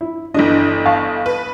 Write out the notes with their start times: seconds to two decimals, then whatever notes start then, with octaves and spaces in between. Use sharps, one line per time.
0.01 E4
0.34 G1 E3 D4 D#5
0.85 F5 A5 C#6
1.26 B4